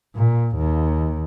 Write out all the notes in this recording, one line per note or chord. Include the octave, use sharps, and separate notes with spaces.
A#2
D#2